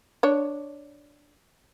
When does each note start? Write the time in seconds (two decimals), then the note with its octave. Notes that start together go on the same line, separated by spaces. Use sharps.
0.23 D4 C#5